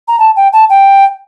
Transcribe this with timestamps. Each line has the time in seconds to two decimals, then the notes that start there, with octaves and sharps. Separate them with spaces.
0.08 A#5
0.19 A5
0.36 G5
0.53 A5
0.70 G5